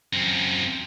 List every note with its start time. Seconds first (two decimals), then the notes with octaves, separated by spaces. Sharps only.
0.13 F#2 C4